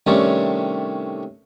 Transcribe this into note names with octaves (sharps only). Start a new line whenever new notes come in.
C3 D#3 G3 A3 C#4 D4